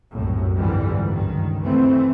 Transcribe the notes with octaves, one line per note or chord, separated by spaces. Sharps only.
C2 F#2 A2
F2 G#2 D3 E3 G3
C#2 G2 D#3
E3 A3 C4